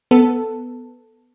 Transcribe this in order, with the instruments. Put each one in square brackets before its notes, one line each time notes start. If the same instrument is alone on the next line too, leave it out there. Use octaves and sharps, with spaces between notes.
[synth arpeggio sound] B3 A4